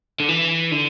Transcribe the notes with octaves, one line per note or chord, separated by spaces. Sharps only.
D3
E3
D3